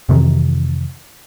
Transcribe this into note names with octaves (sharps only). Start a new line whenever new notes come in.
F2 C3 D#3 E3